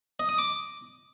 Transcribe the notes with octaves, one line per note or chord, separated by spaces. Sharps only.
D#5
D#6
D6